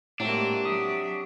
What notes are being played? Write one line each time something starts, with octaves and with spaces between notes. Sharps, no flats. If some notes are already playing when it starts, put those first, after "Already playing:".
A2 C3 F#3 G#3 A#3 D4
F#3 F#4 E5 D#6